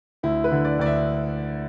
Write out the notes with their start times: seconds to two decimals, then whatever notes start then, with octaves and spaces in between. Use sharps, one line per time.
0.23 D2 E4
0.44 B4
0.52 D3
0.65 D5
0.79 D2 D5
0.86 E5